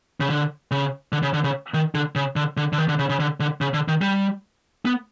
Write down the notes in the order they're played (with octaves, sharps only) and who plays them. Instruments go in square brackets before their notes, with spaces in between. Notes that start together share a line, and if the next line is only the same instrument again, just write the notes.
[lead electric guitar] C#3
D3
C#3
D3
C#3
D3
C#3
D#3
D3
C#3
D3
D3
D3
D#3
D3
C#3
C#3
D3
D3
C#3
D3
D#3
G3
B3